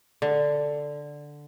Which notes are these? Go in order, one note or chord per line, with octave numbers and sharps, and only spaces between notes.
D3